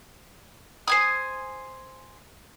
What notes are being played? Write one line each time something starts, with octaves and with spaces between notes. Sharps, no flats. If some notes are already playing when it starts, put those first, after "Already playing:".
C5 G#5 D#6